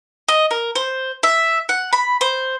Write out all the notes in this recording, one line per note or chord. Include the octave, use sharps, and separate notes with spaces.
D#5
A#4
C5
E5
F#5
B5
C5